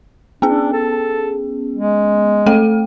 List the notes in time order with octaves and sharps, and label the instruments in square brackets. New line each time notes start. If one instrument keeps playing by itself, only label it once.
[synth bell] B3 C#4 G#4 [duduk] D4
[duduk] A4
G#3
[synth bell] A3 A4 G5